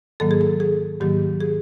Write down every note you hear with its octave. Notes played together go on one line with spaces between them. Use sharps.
G#2 D#3 F#3 A#3 A4
G#4
A4
G#4
G#2 D#3 F#3 A#3 G4
G#4